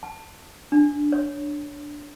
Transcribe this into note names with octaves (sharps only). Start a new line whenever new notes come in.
A5
D4
C#5